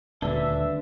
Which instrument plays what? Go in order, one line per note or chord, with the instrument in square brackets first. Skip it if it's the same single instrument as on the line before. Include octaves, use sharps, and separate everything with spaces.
[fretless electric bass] D#1 D2 [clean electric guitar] D3 D4 [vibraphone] B4 [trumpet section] E5